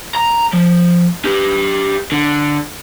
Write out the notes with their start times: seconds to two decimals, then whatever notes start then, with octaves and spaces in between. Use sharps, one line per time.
0.15 A#5
0.53 F3
1.25 G4 B4
2.12 D3